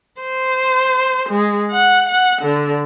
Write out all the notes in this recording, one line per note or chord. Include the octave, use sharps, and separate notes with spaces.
C5
G#3
F#5
F#5
D3